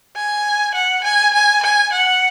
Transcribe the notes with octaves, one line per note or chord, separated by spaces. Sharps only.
G#5
F#5
G#5
G#5
G#5
F#5